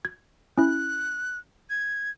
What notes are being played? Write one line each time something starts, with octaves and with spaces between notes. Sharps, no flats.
G#6
C#4 E4 F#6
G#6